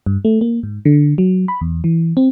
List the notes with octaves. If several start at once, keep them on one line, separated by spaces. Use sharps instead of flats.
G2
A3
A#3
G#2
D3
F#3
B5
E2
E3
C4